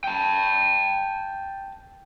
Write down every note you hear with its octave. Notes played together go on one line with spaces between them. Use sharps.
G5 A5